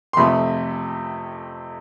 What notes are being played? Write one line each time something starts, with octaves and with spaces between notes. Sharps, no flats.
C6
F2 C3 F3 A3 B5